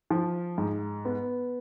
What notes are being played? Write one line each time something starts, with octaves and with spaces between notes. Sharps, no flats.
F3
G#2
B3